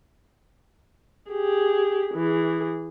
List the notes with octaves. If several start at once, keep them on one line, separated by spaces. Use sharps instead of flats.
G4 G#4
E3 G#4